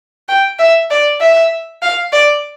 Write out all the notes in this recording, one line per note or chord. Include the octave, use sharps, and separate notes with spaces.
G5
E5
D5
E5
F5
D5